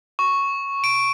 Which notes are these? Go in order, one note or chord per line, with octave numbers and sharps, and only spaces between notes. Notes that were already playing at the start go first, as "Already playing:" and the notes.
C#6
D7